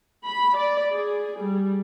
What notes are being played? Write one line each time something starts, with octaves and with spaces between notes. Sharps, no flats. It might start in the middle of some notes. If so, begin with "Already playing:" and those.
B5
D5
G#4
G3